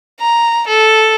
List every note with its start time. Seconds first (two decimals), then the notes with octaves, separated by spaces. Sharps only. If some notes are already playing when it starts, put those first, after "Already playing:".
0.20 A#5
0.68 A4